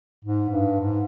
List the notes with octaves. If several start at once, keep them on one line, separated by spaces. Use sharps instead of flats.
G#2
G2
G#2